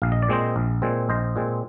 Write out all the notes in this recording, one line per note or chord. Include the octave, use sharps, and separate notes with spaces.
A#1 F5
D#5
D5
A#2 G#3 C4 C5 D#5
A#1
A#2 G#3 C4
A#1 C5 D#5
A#2 G#3 C4